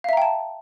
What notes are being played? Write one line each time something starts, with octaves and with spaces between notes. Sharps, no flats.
E5 F5 G5 A5 A#5